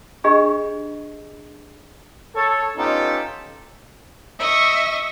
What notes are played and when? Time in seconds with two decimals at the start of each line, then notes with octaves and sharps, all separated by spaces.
0.24 D4 G4 G#4 D#5 B5
2.35 A4 C#5
2.77 B3 C#4 D#4 F4 G4 A4
4.39 D#5 E5 C#6